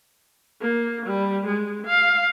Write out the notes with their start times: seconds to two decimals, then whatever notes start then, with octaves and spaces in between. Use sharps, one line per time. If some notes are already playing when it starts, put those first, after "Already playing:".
0.61 A#3
1.06 G3
1.46 G#3
1.87 F5